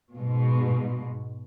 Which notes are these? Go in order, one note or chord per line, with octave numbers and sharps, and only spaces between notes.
G#2 B2